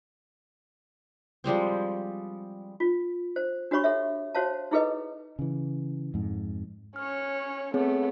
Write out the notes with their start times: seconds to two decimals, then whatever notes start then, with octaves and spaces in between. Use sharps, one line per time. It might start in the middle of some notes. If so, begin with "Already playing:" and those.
1.44 F3 G3 G#3 C4
2.80 F4
3.36 C5
3.71 D4 F#4 G4 C#5 B5 C#6
3.84 A4 C#5 E5
4.35 F#4 C5 C#5 F5 A5
4.71 D#4 E4 G#4 A4 B4 D#5
5.39 C#3 E3
6.14 F2 G#2
6.96 C#4 C#5 F6
7.74 A3 B3 C4 G#4 C#5